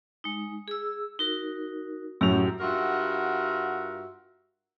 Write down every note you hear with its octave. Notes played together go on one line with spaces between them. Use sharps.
G#3 D#4
G#4 E6
D#4 F#4 A#4
F#2 A2 F#3 C#4 G4
G2 F4 F#4 A#4 E5 F#5